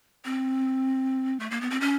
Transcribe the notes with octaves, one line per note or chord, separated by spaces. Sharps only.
C4
A3
A#3
B3
C4
C#4